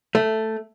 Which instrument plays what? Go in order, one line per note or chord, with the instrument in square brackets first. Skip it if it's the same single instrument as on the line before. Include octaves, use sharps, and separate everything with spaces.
[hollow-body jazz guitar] A3